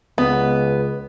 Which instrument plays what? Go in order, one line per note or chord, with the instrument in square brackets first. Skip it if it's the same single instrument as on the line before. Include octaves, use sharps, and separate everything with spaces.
[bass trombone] C#2 [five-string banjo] B3